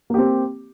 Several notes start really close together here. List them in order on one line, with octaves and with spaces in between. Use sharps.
A#3 G4 C4